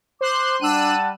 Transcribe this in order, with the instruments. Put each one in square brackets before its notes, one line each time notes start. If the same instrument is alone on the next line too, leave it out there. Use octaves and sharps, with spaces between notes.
[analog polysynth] C5 C6 F#6 [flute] D6
[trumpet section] G3 F#5 A5 [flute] D4 [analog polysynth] E6 F#6 D#7